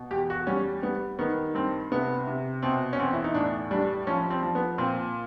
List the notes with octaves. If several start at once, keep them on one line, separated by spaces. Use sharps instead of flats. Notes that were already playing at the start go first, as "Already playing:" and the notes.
Already playing: B2
E2 G4
F#4
G3 C#4
G3 B3
D#3 B3
G2 C4
C3 B3
C3
B2 C4
C#4
E2 C4
E4
D#4
A2 D4
G3 D4
F3 C#4
C4
F3
B3
A#2 C4